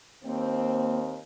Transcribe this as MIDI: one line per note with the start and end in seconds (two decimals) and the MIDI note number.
0.24 1.22 39
0.24 1.00 58
0.24 1.17 60